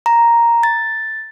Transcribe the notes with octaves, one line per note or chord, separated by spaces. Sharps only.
A#5
A6